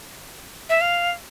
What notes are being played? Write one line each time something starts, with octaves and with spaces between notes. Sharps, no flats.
E5
F5